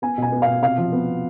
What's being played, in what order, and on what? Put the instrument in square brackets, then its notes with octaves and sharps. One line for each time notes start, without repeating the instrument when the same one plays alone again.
[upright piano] B3 G#5
B2 G#5
B3
B2 F5
C3 F5
F3
B3